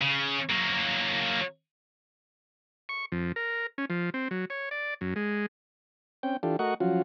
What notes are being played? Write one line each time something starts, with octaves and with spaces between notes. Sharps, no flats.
C#3
F#3 A#3
C#6
F2
A#4
C#4
F3
C4
F#3
C#5
D5
F#2
G#3
C4 C#4 G5
E3 D4 F4 G4 A4
A3 F#4 A#4 D#5 F#5 C#6
F3 F#3 C#4 F4 F#4